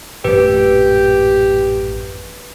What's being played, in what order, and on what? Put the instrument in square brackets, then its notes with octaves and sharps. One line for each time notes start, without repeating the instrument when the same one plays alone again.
[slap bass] A1 F#2 A#2 [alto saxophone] G4 [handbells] B4